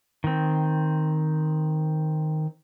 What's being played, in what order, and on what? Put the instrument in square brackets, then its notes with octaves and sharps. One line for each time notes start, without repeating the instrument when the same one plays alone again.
[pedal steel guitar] D#3 C4